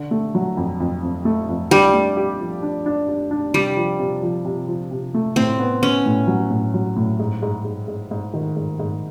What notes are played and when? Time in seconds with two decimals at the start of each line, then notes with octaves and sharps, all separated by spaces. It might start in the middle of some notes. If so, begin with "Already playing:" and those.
Already playing: D3
0.11 A3
0.35 F#3
0.57 F2
0.80 F2
1.03 F2
1.25 A3
1.49 F2
1.71 G3 D4
1.94 A3
2.16 G4
2.40 F3
2.63 D4
2.86 D4
3.09 D4
3.31 D4
3.54 C3 G3
3.77 F3
3.99 C3
4.23 F3
4.45 C3
4.68 F3
4.91 C3
5.14 A3
5.36 A2 C4
5.59 B3
5.82 B3 C#4
6.06 A2
6.27 F#3
6.50 A2
6.74 F#3
6.96 A2
7.19 G#2
7.42 G#2
7.65 G#2
7.88 G#2
8.11 G#2
8.33 D#3
8.56 G#2
8.79 G#2